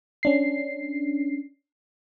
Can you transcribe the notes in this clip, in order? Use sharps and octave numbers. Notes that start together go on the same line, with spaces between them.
C#4 D4 C7